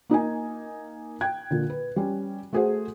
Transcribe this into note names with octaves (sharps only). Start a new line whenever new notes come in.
A#3 D#4 D#5 G#5
G5 F#6 G#6
A#2 D3
B4
G3 C#4
A3 F#4 G#4 A4 C5 F#5